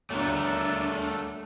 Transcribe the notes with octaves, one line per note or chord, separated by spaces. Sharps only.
D#1 D2 A3 D4 A#4